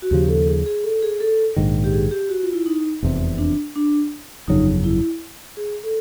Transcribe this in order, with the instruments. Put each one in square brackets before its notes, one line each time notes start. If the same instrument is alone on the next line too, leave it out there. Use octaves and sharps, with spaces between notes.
[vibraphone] F#4
[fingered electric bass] D#2 C#3 F3 [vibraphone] G4
[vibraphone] A4
G#4
G#4
A4
G#4
A4
[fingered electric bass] A#1 G#2 D#3
[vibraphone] G4
G#4
G4
F#4
F4
E4
D#4
[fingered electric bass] F1 E2 C3
[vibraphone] D4
D4
[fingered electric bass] G1 F2 C#3 F#3 [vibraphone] D#4
[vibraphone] E4
G#4
A4